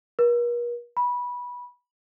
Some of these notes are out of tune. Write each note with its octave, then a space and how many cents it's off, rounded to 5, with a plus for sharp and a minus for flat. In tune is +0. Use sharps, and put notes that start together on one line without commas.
A#4 +45
B5 -15